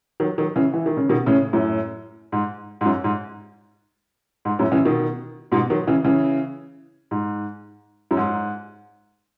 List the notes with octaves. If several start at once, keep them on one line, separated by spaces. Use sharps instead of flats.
D#3 F#3
D#3 F#3
C#3 E3
E3
D#3
C#3
B2 D#3
A2 C#3
F#2 A2
G#2
G#2
F#2
G#2
G#2
F#2 A2
C#3 E3
B2 D#3
G#2 B2
D#3 F#3
C#3 E3
C#3 E3
G#2
F#2
G#2